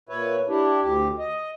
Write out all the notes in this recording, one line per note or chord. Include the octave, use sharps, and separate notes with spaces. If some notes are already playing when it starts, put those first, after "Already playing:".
A#2 B4 C#5 E5
D4 E4 G4
D2 G4
D#5